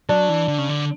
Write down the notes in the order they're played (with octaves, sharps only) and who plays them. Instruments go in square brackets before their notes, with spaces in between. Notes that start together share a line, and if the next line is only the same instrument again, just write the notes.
[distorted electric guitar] F#3 [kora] D4
[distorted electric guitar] E3
D3
C#3
D3